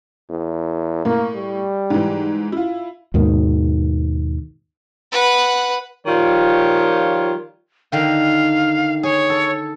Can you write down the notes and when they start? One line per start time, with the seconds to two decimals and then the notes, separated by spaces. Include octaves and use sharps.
0.29 E2
1.05 A2 A#3
1.35 G3
1.90 G#2 E3
2.52 E4 F4
3.14 D#2 G#2 B2 D#3
5.12 B4 F#5
6.06 D#3 F3 G3 F4 C#5
7.92 D3 D#3 F5 G5
9.03 G#4 C#5
9.30 A4